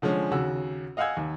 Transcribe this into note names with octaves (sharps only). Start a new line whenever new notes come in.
D3 F3 G#3 C#4
D#2 C#3 F#4 E6
D#5 F5 F#5 G#5 E6 G#6
D#2